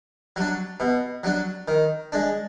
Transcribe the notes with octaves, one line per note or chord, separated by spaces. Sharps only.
F#3 D4
B2
F#3 D4
D#3
G#3 D4